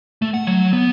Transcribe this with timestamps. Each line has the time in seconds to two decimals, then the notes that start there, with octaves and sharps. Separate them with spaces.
0.22 A3
0.34 F#5
0.47 F#3
0.73 B3